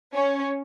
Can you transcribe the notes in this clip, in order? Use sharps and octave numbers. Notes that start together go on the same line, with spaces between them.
C#4